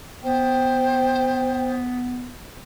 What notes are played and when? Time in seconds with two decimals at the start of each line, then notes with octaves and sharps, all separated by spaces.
0.23 B3 C5 G5